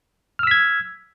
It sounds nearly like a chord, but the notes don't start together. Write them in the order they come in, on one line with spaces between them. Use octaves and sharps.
F6 E6 B6 G#6